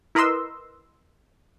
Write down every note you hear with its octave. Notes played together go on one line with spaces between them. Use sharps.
E4 A#4 B4 D#5 C6 E6